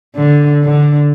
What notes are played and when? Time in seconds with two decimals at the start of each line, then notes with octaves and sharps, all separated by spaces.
0.16 D3
0.63 D3